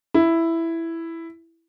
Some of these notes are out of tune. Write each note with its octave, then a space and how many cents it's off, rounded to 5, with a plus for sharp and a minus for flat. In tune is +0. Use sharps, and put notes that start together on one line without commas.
E4 +5